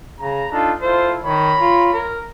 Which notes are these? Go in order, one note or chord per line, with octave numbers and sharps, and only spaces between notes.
C#3 A#5
D4 D#4 F4 A4
E4 F4 A4 C5
D#3 C#5 A#5 B5
F4
A#4